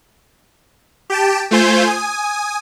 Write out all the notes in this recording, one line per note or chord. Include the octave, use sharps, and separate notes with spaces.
G4 G5 A5
A3 F4 C5 G#5 G6
G#5 D#6